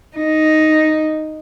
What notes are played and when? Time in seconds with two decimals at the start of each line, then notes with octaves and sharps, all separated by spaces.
0.17 D#4